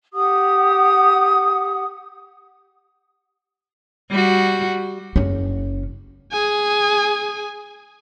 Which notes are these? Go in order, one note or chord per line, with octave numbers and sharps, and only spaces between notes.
G4 F#5 D#6
G3 F#4
F#1 C#4
G#4 G#5